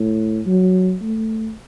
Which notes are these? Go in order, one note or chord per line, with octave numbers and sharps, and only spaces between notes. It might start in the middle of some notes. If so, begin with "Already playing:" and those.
Already playing: A2
F#3
A3